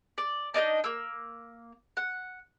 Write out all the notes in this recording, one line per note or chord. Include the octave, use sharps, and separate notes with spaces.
D5
D4 D#4 C#5 D#5
A#3 E6
F#5